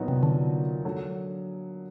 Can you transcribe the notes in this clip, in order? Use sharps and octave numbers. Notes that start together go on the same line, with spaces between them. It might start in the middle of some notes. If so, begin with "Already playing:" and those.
Already playing: A#2 F#3 B3 D#4 F#4
C3
D3
D3 F#3